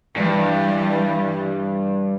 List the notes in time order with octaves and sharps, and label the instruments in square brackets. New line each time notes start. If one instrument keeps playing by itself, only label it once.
[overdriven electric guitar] G2 [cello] E3 G3